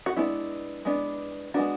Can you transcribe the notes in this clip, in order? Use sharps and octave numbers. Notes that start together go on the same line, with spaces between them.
F#4
G#3 B3 D4 E4
G#3 B3 D4
G#3 B3 D4 F#4